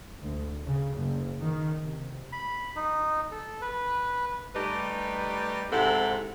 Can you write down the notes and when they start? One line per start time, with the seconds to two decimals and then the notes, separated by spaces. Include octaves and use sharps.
0.21 D2
0.64 C#3
0.95 F#1
1.41 D#3
1.80 C3
2.32 B5
2.76 D#4
3.32 A4
3.61 B4
4.55 G3 A3 D#4 G4 B4
5.71 G#2 C3 C4 E4 A4 F#5